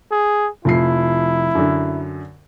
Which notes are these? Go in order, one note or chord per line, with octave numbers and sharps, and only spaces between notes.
G#4
F1 F3 E4 C7
F#2 D3